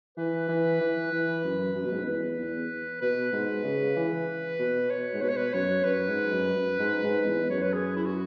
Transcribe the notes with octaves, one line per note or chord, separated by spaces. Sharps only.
E3 B4
E3
E3
E3
F#2
F#2
B2
G#2
F#2
E2 B4
E2
B2 B4
G#2
C#3
E3
B2
C#5
G#2
B2 B4
C#5
B4
F#2 C#5
F#2 B4
G#2
F#2
F#2
G#2
G#2
E2
F#2 C#5
B4
G#4
E4
F#4